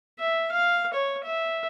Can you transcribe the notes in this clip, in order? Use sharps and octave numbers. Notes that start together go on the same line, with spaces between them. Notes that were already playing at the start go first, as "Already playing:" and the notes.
E5
F5
C#5
E5